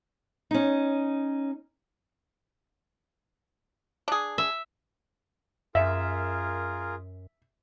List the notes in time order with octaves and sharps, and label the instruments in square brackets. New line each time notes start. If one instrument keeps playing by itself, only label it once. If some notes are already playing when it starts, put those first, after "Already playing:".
[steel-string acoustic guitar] C#4 D#4
[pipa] D4 G#4
[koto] E5
[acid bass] F#2 [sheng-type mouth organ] F4 G#4 A#4 [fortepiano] E5